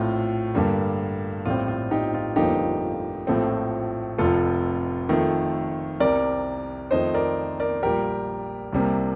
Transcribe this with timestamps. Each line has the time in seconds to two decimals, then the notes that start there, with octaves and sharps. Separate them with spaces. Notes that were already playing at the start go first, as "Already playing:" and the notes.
Already playing: A#1 A2 A3 C4 F4
0.55 G2 D3 G3 A#3
1.46 A#1 A2 G3 C4 F4
1.68 F4
1.91 D#4 G4
2.14 F4
2.36 G1 F2 D3 F3 A#3 D#4 G4
3.27 A#1 A2 F3 A3 C4
4.18 F1 F2 C3 F4 A4
5.09 F2 D#3 A3
6.00 C2 C3 G3 A#4 D5
6.91 F2 D#3 A3 C5 D#5
7.14 A#4 D5
7.60 A#4 D5
7.83 A#1 A#2 G3 G4 A#4
8.73 C2 C3 G3 A#3